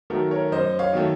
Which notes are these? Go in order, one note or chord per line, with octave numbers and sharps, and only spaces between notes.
D#3 F#3 A3 F#4 A#4
A#4 C#5
F#2 C5 D#5
C#5 F5
D#3 F#3 A3